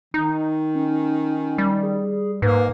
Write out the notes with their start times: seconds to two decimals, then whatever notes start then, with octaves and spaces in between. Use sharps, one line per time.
0.14 D#3 D#4
0.75 C#4
1.58 G3
1.83 G#4
2.42 G#2 A#3 B4